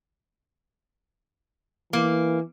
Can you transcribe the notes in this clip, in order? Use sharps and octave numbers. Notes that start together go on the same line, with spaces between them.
E3 A#3